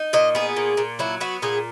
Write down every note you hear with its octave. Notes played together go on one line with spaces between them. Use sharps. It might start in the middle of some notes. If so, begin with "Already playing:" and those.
Already playing: D#4
A#2 D#5
B3 G#4
A#2
A#2
F#3 E4
B3 F#4
A#2 G#4